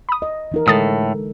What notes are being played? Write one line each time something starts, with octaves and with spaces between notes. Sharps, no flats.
B5 D#6
D#5
E3 D#4 A#4
A2 D3 G#3 A4 D#6 A6